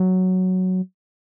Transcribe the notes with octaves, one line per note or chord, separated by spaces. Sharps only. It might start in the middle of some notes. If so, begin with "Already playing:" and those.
Already playing: F#3